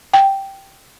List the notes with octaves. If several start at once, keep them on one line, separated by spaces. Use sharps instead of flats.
G5